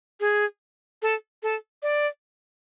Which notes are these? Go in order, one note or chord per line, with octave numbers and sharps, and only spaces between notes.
G#4
A4
A4
D5